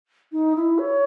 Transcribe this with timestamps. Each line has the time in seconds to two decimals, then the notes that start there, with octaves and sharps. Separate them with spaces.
0.32 D#4
0.56 E4
0.79 C#5